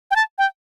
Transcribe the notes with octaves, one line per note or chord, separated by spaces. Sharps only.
G5
A5
G5